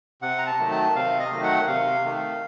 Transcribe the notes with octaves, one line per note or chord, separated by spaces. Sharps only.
C3 F#5
A#5
A5
D#3 F#3 A3
A5
C3 F5
D#5
D#3 F#3 A3
F#5
C3 F5
D#3 A3